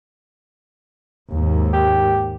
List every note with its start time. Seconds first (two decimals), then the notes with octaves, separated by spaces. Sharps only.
1.31 D#2 G#2
1.73 G4